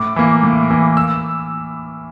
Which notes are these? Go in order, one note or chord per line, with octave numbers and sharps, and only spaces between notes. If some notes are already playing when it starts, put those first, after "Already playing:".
Already playing: A2 D6
E3 A#3
A2
E3 A#3
E6